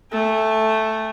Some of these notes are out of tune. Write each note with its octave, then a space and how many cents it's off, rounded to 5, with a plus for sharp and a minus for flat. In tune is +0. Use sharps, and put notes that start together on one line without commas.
A3 +0 G#5 -40